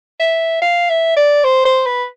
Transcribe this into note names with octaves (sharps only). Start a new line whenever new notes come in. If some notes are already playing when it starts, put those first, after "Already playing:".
E5
F5
E5
D5
C5
C5
B4